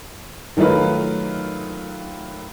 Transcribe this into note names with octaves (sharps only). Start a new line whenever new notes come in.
D#3 F#3 A3 D#4 F4 B4